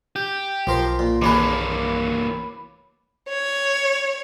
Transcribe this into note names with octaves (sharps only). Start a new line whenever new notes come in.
G4 G6
B1 F3 A#4 C5 C6
A#2
D#2 E3 A#3 D4 G#4 B4 C#5 D6
C#5